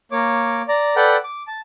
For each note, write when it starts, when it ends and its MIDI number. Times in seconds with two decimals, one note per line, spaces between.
0.12 0.62 58
0.12 0.62 73
0.12 0.62 86
0.68 0.96 74
0.68 0.96 82
0.96 1.17 69
0.96 1.17 71
0.96 1.17 74
0.96 1.17 78
0.96 1.17 79
1.24 1.43 86
1.47 1.61 81